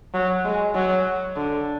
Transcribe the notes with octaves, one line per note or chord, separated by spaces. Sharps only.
F#3
G#3
F#3
D3